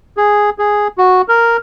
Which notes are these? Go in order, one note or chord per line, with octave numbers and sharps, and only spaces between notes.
G#4
G#4
F#4
A#4